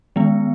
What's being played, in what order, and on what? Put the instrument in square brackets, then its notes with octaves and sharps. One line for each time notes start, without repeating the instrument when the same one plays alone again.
[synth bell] D#3 G#3 B3